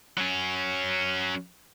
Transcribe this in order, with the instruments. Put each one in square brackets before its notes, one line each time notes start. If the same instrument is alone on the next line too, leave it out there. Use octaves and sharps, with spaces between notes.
[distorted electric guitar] F#3 C#4